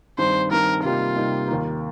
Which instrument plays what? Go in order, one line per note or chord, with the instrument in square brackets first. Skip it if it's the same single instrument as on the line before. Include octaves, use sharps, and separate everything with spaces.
[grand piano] G2 D#3 C4 [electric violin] C5
[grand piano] G2 D#3 C4 [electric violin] A#4
[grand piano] C3 G3 A#3 D#4 [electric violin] F4
[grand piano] C3 G3 A#3 D#4
D#2 D#3 A#3